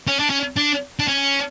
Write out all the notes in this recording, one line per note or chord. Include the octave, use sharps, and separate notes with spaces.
C#4
D4
C#4
D4
D4
C#4